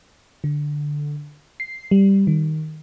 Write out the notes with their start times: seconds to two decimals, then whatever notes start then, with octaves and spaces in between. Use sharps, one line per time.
0.44 D3
1.60 C7
1.91 G3
2.27 D#3